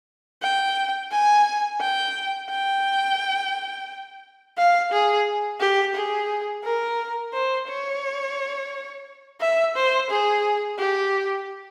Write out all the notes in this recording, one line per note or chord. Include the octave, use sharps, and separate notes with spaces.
G5
G#5
G5
G5
F5
G#4
G4
G#4
A#4
C5
C#5
E5
C5
G#4
G4